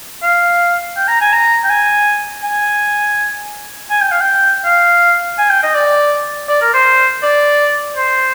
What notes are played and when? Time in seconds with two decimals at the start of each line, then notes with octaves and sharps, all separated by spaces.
0.23 F5
0.97 G5
1.08 A#5
1.21 G#5
1.33 A#5
1.64 G5
1.70 G#5
2.43 G#5
3.90 G#5
4.01 G5
4.11 F5
4.21 G5
4.65 F5
5.38 G#5
5.50 G5
5.63 D#5
5.75 D5
6.48 D5
6.61 A#4
6.74 C5
7.23 D5
7.96 C5